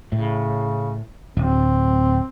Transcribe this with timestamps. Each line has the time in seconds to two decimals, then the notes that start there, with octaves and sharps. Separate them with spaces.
0.12 A2 C#3
1.37 D1 C4